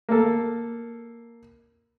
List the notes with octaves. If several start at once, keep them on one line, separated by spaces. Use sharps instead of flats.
A#3 A4